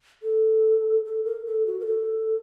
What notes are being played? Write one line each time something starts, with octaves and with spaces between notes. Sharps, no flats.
A4
A4
A#4
A4
F#4
A#4
A4